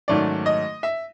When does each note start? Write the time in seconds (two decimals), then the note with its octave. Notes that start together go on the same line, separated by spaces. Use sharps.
0.08 G#2 D#3 F#3 A3 C#4 D5
0.46 D#5
0.83 E5